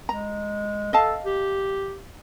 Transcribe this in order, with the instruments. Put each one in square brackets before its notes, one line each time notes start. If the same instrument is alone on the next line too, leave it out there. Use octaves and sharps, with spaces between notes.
[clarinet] G#3 [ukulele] A#5
[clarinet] A4 [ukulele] D#5 F5 A5
[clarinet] G4